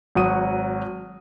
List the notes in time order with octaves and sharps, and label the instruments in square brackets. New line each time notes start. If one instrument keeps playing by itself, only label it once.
[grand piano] G#1 F#3 F#5 D#6 D#7